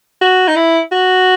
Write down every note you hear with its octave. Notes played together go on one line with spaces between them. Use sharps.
F#4
D#4
E4
F#4